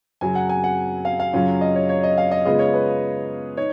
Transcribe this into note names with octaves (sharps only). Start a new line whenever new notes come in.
F#2 C#3 F#3 G#5
F#5
G#5
F#5
F5
F5
F#2 C#3 F#3 C#4 F4
D#5
C#5
C#5
D#5
F5
D#5
C#3 G#3 B3 F4 D#5
C#5
B4
D#4 C#5